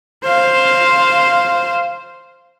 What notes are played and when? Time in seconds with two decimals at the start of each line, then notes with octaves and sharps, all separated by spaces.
0.24 C5 F5